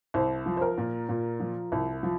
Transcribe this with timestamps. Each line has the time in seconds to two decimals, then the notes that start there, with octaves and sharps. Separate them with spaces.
0.14 C2 C5
0.46 F3
0.57 C5
0.61 A#4
0.78 A#2
1.09 A#2
1.40 F3
1.72 C2
2.03 F3